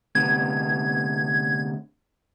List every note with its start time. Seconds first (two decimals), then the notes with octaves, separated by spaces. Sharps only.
0.15 D2 C3 B3 G#6